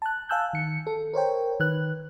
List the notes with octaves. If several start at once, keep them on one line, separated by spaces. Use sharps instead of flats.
A5 F#6
F5 G#5 A5 E6 F#6 G6
D#3 C#7
A4
A#4 C5 C#5 G5
D#3 B4 F#6